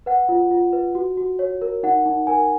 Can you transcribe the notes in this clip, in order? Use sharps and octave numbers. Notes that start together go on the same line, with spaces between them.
B4 F#5
F4
F4
B4
F#4
F#4
C#5
A#4
D#4 F#5
D#4
A#4 G#5